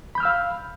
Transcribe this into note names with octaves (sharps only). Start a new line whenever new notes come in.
F5 B5 E6 F6 G6